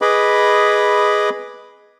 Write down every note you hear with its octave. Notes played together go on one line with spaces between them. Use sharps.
G#4 B4 D#5 B5 D6